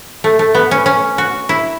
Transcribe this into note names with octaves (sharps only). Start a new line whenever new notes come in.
A3
A3
B3
C#4
C#4
F#4
E4